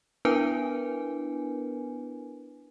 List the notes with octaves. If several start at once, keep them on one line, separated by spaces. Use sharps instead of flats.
B3 D4 E4 A#4 B4 G#5